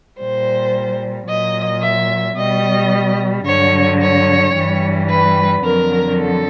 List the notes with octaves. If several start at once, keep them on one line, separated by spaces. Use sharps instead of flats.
A#2 G3 C5
A#2 F#3 D#5
E5
B2 G3 D#5
G2 D3 F#3 C#5
C#5
G2 E3 G3
B4
F2 D3 F#3 A#4
A4